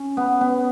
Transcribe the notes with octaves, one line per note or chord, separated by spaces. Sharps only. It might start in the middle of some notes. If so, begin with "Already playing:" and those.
Already playing: C#4
B3
B3